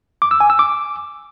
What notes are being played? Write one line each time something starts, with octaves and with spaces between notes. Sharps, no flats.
D6
E6
G#5
E6
D6